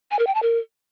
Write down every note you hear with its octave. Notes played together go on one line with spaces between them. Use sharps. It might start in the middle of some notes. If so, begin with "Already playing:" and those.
G#5
A#4
G5
A5
A#4